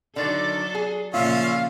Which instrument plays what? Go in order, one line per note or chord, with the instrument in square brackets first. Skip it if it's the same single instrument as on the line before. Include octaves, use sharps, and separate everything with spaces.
[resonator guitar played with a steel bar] D3 D#3 [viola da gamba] F#3 D4 A4 [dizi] D5
[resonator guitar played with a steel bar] G#4
[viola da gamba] A#2 C#3 F3 [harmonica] C#4 E5 [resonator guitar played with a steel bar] F4 [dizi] F5